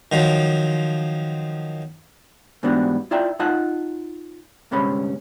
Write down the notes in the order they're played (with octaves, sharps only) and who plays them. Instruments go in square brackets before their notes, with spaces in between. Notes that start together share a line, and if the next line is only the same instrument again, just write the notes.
[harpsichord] D#3 F3 F#3
[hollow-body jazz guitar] G#2 E3 G3 B3 D4 F#4
E4 F4 D5 E5 G5 A#5
D#4 F4 D#5 F#5 A5
D2 G2 C3 G#3 C#4 B5